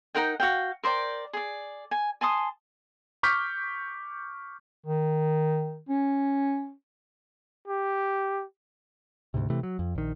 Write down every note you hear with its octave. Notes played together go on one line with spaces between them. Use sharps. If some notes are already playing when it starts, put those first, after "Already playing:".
D#4 A#4 F#5 G5
F#4 F5 G5
A#4 C5 D5 G5
G#4 D5
G#5
G#5 A5 C6 D#6
C#6 D6 F6 G6 B6
D#3
C#4
G4
D2 G#2 C3
C3 E3 A3
F#3
F2
A#1 D#3